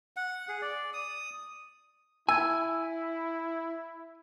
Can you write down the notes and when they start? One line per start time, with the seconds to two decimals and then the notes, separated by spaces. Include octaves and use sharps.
0.16 F#5
0.49 G#4
0.62 D5
0.93 D#6
2.29 E4 G#5 E6 G#6